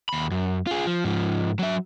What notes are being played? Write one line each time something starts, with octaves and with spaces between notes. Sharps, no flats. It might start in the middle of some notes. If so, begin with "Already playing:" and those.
D#2 B5
F#2
F4 G#4
F3
G#2 F3
F#3 E5